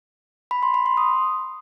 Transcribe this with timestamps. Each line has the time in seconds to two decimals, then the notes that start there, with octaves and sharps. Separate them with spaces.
0.51 B5
0.63 C6
0.74 B5
0.86 C6
0.97 D#6